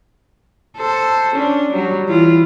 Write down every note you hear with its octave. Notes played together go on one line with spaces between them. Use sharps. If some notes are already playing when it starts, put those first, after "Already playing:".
A4 C5
C#4 D4
F#3 G3
E3 E4 F4